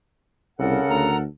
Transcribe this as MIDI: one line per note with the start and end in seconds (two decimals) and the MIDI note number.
0.59 0.78 36
0.59 1.10 49
0.59 1.21 69
0.59 1.21 70
0.59 1.21 78
0.89 1.26 38
0.89 1.17 82